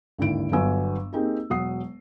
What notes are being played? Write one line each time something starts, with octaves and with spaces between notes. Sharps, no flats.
G#1 D#2 D3 D#3 E4 D7
G1 F#3 B3 D4 G#5 E6
A#3 C4 D#4 G4 G#4
E1 F#3 F#5 D#6 C7